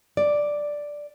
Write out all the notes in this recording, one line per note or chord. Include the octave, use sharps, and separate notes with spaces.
D5